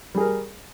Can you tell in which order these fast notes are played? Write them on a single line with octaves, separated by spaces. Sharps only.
G3 G#4 A#4